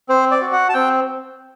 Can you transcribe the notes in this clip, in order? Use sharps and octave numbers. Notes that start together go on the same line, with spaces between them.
C4 C5
D5
F#4
F#5
A5
C4 G5